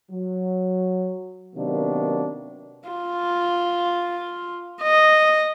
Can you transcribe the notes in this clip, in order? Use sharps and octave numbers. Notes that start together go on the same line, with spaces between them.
F#3
C3 D#3 F#3 A#3 B3 D4
F4
D#5